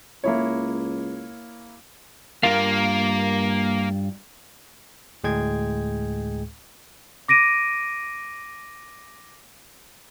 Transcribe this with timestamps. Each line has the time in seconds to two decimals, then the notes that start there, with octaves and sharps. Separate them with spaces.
0.24 C#2 A#3 E4 C#5
2.43 G2 A#3 F4 F5
5.24 D2 A2 G#3 G#4 G5 G#6
7.28 D6 A#6 D7 D#7